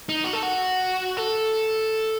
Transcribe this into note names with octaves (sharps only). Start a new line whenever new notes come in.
D#4
F#4
A4
F#4
A4